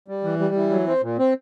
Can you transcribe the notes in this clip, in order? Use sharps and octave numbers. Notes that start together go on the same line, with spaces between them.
G3
E3
G3
E3
F#3
C4
A#2
C4